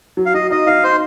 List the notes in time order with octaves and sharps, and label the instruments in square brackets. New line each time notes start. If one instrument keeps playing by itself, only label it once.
[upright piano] F#3
[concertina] F5
[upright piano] F#3 [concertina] D#5
[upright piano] D#4 [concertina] D#5
[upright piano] D#4 [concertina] F5
[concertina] C5